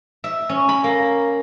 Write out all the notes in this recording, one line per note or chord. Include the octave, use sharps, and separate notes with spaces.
E5
C#4
B5
A#3